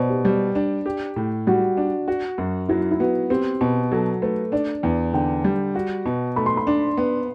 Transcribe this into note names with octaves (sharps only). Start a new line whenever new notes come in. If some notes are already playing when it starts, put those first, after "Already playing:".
Already playing: B2 C5 D5
G4
G3
D4
G4
A2
G3 F#4
D4
F#4
F#2
F#3 E4
E4
B3 F#4
C4 G4
B2
F#3 A4
A3 B4
D4 D5
E2
D3 G5
G3
F#4
B2
A3 B5
C6
B5
D4
B3